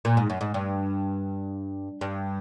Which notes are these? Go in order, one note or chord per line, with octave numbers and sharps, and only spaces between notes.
A#2
G#2
F#2
G#2
G2
G2